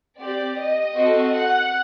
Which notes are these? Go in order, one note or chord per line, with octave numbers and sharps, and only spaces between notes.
C4 G4 D5
D#5
C4 F#4 A4
F#5